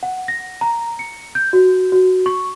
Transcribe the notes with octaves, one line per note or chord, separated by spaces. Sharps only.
F#5
A#6
A#5
C#7
G6
F#4
F#4
C#6